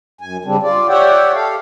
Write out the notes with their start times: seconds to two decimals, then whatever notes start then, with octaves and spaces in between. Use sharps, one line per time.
0.21 F#2 G#5
0.45 C#3 G3 C4 D4
0.63 F4 D5
0.89 G4 C#5 D5 E5 F#5 G5
1.34 G4 A4 F5